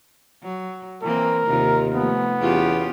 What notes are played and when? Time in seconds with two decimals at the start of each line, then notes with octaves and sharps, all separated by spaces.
0.43 F#3
1.03 E3 A#3 C4 A#4
1.47 D#2 C3 D#3 F4
1.94 F3 A3 B3
2.41 E2 C#4 F4 G4